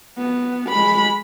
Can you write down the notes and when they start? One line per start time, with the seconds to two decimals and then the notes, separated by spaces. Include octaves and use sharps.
0.18 B3
0.69 G#3 B5